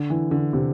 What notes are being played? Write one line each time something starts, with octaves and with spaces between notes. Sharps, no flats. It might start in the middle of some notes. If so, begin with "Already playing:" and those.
Already playing: D3
E3
D3
C3